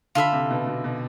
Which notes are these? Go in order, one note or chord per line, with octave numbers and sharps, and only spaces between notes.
D3 F4 A4 E5 B5
C3
B2
B2
B2